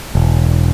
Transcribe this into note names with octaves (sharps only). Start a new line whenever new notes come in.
E1